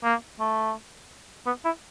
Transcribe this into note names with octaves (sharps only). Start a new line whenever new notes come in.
A#3
A3
B3
E4